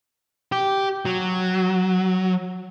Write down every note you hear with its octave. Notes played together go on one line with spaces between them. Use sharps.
G4
F#3